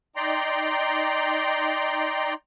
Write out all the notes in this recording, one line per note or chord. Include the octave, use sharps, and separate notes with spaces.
D#4 D5 G5 A#5 C6